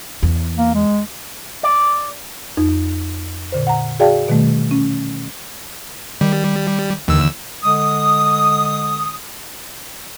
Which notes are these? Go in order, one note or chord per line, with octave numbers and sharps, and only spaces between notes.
E2
A#3
G#3
D5
F2 D#4
A#2 D3 C5
F#5 A#5
F#4 G#4 D5 F5 G5 A5
B2 D#3 G3 A3
C#4
D#3 G3
D#2 D3 E3 E6
D3 G#3 D#6